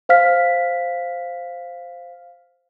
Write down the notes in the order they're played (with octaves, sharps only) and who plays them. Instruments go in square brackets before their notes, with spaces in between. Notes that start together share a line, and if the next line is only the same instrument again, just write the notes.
[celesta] C5 F5 F6 B6